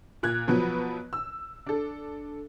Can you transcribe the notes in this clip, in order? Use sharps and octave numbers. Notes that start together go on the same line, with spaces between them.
A#2 F#6 G#6
B2 F3 F#3 B3
E6
D4 A4